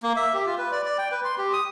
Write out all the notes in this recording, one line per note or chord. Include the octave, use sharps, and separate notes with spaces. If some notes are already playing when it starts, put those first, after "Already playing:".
A#3
E5
G4
F4
B4
D5
D5
G5
B4
C6
G4
D#6